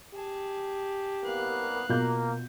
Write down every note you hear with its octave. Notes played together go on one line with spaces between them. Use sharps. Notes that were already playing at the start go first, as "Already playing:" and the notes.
G4 G#4 A5
C2 A#3 B3 F5 F#6
B2 A#3 F4 G6